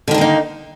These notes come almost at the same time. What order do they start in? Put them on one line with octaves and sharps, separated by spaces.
D3 D#3 D4 A#3 D#4